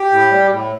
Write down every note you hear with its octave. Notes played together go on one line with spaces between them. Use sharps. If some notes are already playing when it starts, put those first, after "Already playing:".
Already playing: G4
A2
G3
A2